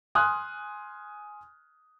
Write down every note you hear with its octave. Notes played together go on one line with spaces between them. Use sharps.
G#5 C6 D#6 F6 F#6